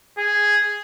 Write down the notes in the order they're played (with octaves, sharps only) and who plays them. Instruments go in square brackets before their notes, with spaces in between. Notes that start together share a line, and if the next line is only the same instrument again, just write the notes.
[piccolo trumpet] G#4